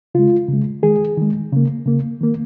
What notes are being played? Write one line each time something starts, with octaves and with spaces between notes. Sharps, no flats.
C#3 G#3 F4
C#3 G#3
D#3 G#3 G#4
D#3 G#3
C#3 A#3
C#3 A#3
D#3 A#3